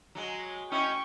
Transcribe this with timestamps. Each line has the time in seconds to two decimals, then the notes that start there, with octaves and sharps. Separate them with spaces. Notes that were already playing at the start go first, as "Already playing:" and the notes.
0.15 F#3 G#3
0.72 C#4 E4 D#5 G5 C#6